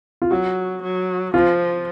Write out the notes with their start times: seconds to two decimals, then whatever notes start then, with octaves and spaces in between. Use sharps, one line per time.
0.22 F4
0.31 F#3 F#4
0.83 F#3
1.34 F3 F4